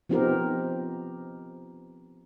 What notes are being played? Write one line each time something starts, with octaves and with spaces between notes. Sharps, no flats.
F3 B3 C4 D#4 G4 A#4